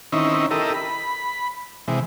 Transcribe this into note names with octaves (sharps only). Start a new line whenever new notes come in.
D#3 C4 C#4 D#4 E4
E4 G4 A4 A#4 D#5
B5
C3 E3 G#3